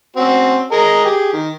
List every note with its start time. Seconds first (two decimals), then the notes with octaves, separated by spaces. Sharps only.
0.16 C4 C#4 F#4
0.72 G#4 A#4 D#5
1.05 G4 G#4
1.33 D#3